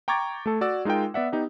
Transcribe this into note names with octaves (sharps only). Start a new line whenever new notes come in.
G5 A#5 C#6 D6 G#6 A6
A3 A4
F#4 D5 E6
G#3 D#4 F4 A#4 G5
B3 D5 E5 F#5
B3 D#4 G4